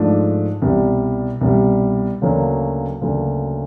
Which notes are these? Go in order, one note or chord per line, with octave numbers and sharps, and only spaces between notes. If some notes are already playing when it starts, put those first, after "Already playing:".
Already playing: G#2 F3 A3 D4
C2 B2 G3
C2 B2 G3
D2 C#3 F#3 A#3 D4
D2 C#3 F#3 A#3 D4